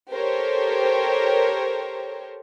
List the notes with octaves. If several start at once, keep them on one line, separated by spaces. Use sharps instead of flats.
G4 A4 A#4 C5 C#5